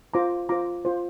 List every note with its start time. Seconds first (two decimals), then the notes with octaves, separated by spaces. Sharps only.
0.14 F4 C5 A#5 D6
0.49 F4 C5 A#5 D6
0.85 F4 C5